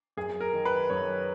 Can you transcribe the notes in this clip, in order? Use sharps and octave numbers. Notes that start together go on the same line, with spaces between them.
F#2 G#4
A#4
D#3
B4
F#2 C#5